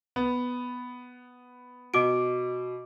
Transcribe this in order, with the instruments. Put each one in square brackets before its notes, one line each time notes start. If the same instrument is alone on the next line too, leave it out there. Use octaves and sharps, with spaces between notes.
[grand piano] B3
[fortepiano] B2 [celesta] D#5 D6 D7